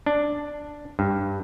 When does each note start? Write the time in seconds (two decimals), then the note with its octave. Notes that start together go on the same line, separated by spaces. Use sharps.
0.06 D4
0.99 G2